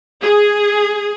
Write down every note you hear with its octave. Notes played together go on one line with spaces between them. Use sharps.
G#4